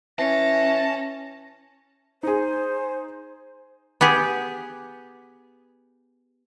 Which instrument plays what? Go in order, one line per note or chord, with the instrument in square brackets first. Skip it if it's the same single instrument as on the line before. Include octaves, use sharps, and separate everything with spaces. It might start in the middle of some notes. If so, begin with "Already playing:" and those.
[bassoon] E3 [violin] C#4 [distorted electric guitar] A5 [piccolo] A#6
[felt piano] D#4 G#4 [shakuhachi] C5
[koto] B3 G4 G#4